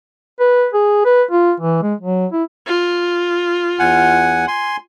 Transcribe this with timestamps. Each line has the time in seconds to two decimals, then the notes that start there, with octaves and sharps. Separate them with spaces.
0.40 B4
0.74 G#4
1.06 B4
1.31 F4
1.60 E3
1.83 G#3
2.01 F#3
2.33 E4
2.67 F4
3.79 E2 F#5 G#5
4.48 G#5 C6